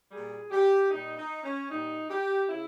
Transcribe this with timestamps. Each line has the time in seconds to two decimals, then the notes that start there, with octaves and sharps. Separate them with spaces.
0.11 A#2 G3 G#4
0.51 G4
0.90 A#2 G3 D#4
1.17 D#4
1.43 C#4
1.70 A#2 G3 D#4
2.09 G4
2.49 C#3 E4